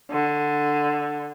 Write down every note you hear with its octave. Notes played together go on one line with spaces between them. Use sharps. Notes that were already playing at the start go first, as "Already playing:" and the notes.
D3